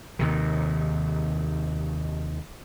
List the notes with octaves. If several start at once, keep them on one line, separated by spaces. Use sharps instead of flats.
D#2 C3 D#3